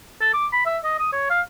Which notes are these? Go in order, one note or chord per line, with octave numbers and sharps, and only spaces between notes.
A4
D6
B5
E5
D#5
D#6
C#5
F5